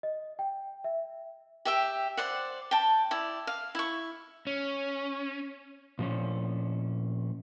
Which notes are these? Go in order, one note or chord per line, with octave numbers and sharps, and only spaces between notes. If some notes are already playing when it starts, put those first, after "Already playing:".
D#5
G5
E5
G4 E5 G5
C5 D5 F#5
G5 A5
E4 D5
F5
E4 C#6
C#4
A#2 F3 C#4